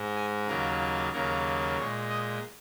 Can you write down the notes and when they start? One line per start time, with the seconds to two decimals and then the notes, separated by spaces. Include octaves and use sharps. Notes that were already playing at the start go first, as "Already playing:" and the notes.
Already playing: G#2 G#3
0.16 G#5
0.48 D#2 C#3 F#3 A#3 A#4
1.13 D#2 C#3 F#3 A#3 A#4
1.77 A#2 G#3 C#5
2.09 D#5